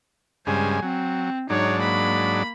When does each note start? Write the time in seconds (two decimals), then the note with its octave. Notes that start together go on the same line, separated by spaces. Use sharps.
0.47 G2 C#3 G#3 C5 G#5
0.82 F#3 C4
1.50 G#2 F#3 D4 D#4 C#5
1.80 A#3 B5